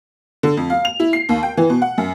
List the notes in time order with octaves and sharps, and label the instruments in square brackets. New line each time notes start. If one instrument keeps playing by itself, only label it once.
[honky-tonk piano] D3
F2
F5
F7
E4
C7
D#2
G5
E3
B2
F#5
F#2